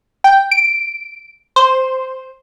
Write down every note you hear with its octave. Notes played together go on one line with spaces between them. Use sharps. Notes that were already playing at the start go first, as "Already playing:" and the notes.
G5
D7
C5